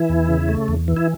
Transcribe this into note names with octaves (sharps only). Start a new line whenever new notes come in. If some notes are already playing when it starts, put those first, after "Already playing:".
Already playing: E3 E4
E2
C#3
A3
E2
E3
E4